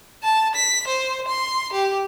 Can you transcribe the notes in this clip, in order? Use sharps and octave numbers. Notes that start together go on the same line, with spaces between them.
A5
B6
C5
C6
G4